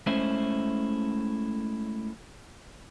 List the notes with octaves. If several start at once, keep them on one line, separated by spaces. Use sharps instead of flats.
G#3 A3 C#4 E4 C5 E5